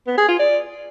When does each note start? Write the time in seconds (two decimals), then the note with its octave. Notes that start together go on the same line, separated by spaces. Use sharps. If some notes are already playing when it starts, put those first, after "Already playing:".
0.07 B3
0.18 G#4
0.28 F4
0.39 D5